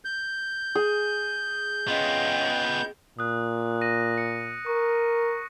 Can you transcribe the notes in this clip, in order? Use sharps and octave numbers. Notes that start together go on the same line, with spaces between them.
G6
G#4
B3 C#4 F4 D#5 G5
A#2 D#6 F#6
A#6 D#7
C#7
A#4 C#6